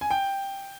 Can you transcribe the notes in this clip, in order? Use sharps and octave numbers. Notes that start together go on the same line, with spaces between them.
G#5
G5